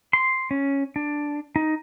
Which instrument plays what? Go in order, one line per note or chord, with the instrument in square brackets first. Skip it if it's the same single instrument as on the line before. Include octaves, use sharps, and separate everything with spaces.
[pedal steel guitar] C6
C#4
D4
D#4